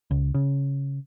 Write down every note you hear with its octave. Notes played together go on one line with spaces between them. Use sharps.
C#2
C#3